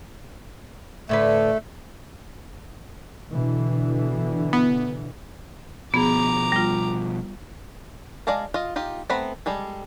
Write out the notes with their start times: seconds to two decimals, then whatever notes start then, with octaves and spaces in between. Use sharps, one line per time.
1.09 A2 D3 A3 B4
3.31 B2 D3 E3
4.53 B3
5.94 B2 F3 B3 G#4 A#5 D6
6.52 G3 F4
8.27 G#3 D5 F5 A5 A#5
8.54 F4 D#5
8.76 D#4 F4 G4
9.10 A3 B3 C4 A#5 B5
9.46 G3 G#3 A4